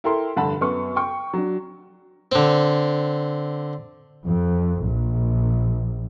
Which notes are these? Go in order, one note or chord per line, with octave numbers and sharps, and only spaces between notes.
E4 A4 A#4 G5 C6
F1 G2 D3 F#5 A5 B5
F#2 B3 C#6
G5 C#6
F#3 D4
D3 C4
F2
A#1